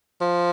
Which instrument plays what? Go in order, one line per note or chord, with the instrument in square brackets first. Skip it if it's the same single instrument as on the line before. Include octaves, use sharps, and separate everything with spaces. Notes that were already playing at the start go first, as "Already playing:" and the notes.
[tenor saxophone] F3